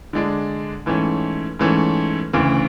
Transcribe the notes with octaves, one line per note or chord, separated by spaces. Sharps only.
D3 G#3 D4
G#2 E3 A3 C#4
G#2 E3 A3 C#4
D2 C#3 E3